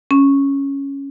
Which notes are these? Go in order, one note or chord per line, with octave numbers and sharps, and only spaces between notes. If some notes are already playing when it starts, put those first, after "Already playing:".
C#4